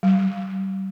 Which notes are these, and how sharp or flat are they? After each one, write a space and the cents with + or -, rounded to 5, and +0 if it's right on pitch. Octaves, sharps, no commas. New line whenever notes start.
G3 -35